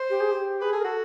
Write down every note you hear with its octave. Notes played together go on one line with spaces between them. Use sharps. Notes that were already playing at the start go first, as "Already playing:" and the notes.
Already playing: C5
G4
G#4
G4
G#4 B4
G#4 A4
A#4
F#4 A4